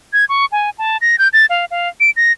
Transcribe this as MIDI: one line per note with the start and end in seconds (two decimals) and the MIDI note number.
0.13 0.25 92
0.29 0.45 85
0.52 0.70 80
0.78 0.97 81
1.01 1.16 94
1.19 1.28 91
1.33 1.46 93
1.50 1.65 77
1.71 1.89 77
2.00 2.11 98
2.17 2.32 94